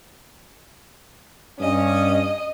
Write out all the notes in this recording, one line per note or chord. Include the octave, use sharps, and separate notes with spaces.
G2 C#4 D#5